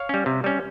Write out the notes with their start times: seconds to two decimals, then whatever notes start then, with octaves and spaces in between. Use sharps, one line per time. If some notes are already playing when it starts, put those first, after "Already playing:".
Already playing: C#5 F5
0.09 G3 C#4
0.26 C3
0.44 G3 C#4